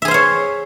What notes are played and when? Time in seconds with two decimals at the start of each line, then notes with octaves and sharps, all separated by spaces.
0.02 E5
0.05 G#4
0.08 C5
0.11 F5
0.14 C#5